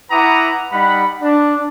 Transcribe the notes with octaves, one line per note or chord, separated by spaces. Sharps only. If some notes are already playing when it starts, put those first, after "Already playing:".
E4 B4 F#5 A#5 D6 D#6
G3 D#4 F#5 B5
D4